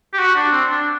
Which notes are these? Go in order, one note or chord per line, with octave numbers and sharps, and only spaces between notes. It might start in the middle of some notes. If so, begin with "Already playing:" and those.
G4
F#4
D4
C4
D4